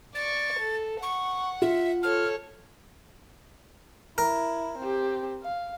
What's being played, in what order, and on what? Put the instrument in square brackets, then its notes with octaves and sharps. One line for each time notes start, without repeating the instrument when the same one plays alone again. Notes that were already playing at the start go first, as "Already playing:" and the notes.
[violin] D5 C#6 [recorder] A6
[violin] A4
[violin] F#5 [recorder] C#6
[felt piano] F4 [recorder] E5
[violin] A4 C#5 [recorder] F6
[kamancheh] E4 [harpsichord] A#4
[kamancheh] C4 G4
F5